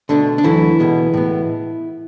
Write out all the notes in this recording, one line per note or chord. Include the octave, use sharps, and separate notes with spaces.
B2 D3 A3 D4
D4
D2 D3 E3 F#3 A3 E4
C#2 B2 G#3 B3
A2 G#3 B3